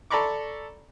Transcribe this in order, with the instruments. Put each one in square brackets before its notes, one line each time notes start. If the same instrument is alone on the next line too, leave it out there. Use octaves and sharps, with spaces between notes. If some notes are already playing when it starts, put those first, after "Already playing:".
[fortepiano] A4 D5 A#5 B5 C#6 D6